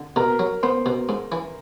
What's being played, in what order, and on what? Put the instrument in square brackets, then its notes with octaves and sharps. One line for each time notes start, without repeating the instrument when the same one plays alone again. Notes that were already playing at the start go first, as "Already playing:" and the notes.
Already playing: [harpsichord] D3
[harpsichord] B2 [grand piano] A#4 A#5
[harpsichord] F#3
[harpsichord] B3 [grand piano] C5 C6
[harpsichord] B2
G#2
E3